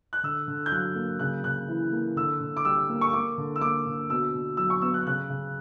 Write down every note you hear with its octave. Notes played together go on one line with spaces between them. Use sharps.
F#6
D3 E6
D3
G6
F#3 F#6
A#3
C#3 F#6
C#3 F#6
E3
A#3
D3 E6
D3
D6
G3 E6
A#3
C#6
A#3 D6
D3
E6
A#3 D6
D3
B2 E6
B2
F#3 E6
C#6
B3 E6
F#6
C#3 F#6
C#3